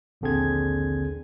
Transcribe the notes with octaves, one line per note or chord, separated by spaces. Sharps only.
A#1 D#2 D3 C4 G#4 G#6